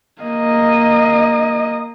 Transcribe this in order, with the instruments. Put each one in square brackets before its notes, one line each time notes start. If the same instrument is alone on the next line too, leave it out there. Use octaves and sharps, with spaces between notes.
[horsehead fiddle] A#3 D#5